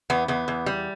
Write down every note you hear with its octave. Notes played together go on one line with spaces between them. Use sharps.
E2 B3
E2 B3
E2
G3